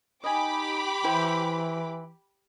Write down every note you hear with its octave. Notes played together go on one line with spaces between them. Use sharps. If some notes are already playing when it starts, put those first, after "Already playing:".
D#4 G4 D#5 G#5 B5 D6
E3 E4 C5 G5